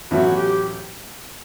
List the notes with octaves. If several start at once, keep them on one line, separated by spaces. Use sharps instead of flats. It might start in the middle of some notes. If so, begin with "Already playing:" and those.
A1 A2 F#3 B3 E4 F#4
G4